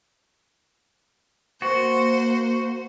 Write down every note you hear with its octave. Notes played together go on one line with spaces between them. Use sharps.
A#3 F#4 C5